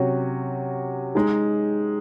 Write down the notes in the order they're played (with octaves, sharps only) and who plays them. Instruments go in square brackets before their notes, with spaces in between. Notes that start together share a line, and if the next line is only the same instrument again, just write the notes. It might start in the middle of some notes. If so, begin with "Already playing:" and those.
Already playing: [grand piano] C3 F#3 C#4 F#4
G#3 D#4 G#4